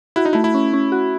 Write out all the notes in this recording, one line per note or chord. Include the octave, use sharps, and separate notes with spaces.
E4 F#4
D#4
A3 E4
E4
C#4
C#4
F#4